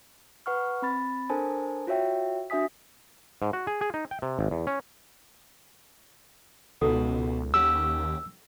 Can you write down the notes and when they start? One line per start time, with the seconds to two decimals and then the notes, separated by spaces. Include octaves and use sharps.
0.46 B4 F#5 C#6 F6
0.82 C4 B5 A6
1.29 D4 A4 A#4 C5 G#5 A5
1.87 F4 F#4 C#5 E5 G5
2.50 D4 F#4 E5 G#5 D#6 B6
3.42 G#2
3.53 F#4
3.67 G#4
3.81 G#4
3.94 D#4
4.11 G5
4.22 C3
4.39 G#1
4.51 E2
4.67 C#4
6.82 C#2 B2 D#4 A4
7.54 D#2 C#4 G4 F#5 E6